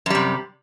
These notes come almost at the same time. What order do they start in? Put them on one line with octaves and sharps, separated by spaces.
F#2 G3 C3